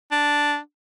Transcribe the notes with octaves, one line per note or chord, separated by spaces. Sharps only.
D4